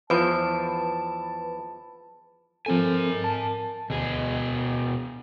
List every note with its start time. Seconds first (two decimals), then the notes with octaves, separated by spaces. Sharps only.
0.10 E2 F3 B4 A5 B5
2.66 F3 C4 A4 A#4 G#5
3.24 A5
3.90 D2 B2 G#4